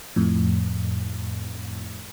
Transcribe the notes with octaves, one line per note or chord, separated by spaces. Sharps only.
F2 A2